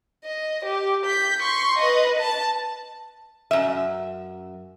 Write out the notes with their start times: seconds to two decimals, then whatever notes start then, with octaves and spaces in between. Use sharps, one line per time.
0.24 D#5
0.65 G4
1.06 G6 B6
1.42 C6 C#6
1.79 B4 D#5
2.19 A5
3.51 F#2 E5